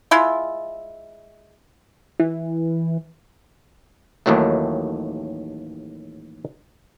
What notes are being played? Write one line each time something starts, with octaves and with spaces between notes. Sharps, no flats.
G#3 E4 F4
E3
A1 D#2 A2 D#3 F#3 A3